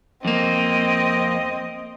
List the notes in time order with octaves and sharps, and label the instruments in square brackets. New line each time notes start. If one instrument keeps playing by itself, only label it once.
[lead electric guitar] F2 A#3 [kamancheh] C4 D#5